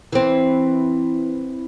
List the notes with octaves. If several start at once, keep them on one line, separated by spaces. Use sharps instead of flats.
E3 C4